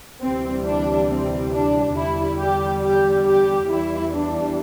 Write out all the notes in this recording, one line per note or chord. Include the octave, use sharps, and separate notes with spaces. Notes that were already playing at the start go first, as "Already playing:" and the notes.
D2 C3 E3 G3 C4
D4
C4
D4
E2 D3 G3 E4
G4
G4
G4
E2 E3 G3 E4
D4